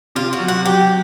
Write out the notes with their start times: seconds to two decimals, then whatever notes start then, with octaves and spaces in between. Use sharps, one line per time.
0.16 C3 F4
0.33 F#4
0.40 F#3
0.48 F#4
0.65 F#3 G4